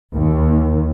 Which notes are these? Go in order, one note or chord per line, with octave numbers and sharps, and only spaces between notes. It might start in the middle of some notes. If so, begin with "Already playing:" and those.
D#2